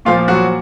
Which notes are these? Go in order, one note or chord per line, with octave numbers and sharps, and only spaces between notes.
A#2 F3 F4 F5
F#3 F#4